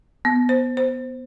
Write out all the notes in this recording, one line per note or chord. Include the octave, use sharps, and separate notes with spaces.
B3
C5
C5